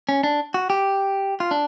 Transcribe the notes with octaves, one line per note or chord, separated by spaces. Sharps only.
C#4
D4
F#4
G4
F4
D4